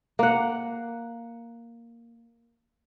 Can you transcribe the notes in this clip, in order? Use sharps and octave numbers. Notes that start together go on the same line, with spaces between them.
A#3 F#5